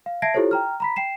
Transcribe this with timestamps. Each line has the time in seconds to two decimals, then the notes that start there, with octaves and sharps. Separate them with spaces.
0.06 F5
0.22 E5 A5 G#6 A#6 C7 D7
0.34 E4 F4 G4 A4 C5 C#5
0.51 G5 A#5 F6
0.80 A#5 B5 B6
0.96 G5 C7 E7